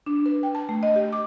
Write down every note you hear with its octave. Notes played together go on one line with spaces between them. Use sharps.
D4
B4
G5
A5
A3
D#5
G4
D6